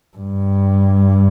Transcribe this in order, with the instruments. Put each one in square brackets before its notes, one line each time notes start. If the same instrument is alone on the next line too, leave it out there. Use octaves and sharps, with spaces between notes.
[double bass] G2